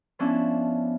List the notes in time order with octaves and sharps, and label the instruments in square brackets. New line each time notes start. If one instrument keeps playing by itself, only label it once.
[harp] F3 B3 C#4 D4 E4